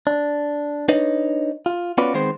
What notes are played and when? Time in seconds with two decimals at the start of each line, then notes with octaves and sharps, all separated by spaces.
0.07 D4
0.88 D4 D#4 B4 C#5 D#5
1.66 F4
1.98 B3 C#4 F4 F#4 B4 D5
2.14 D#3 G#3 B3 C4 C5